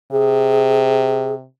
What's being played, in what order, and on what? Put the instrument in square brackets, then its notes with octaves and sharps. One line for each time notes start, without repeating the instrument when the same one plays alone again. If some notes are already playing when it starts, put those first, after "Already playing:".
[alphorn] C3 [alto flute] G#4